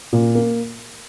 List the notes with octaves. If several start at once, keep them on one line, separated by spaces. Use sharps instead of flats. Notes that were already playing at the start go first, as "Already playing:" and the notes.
A#2
A#3